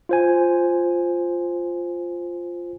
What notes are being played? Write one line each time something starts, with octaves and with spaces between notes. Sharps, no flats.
F4 C5 G#5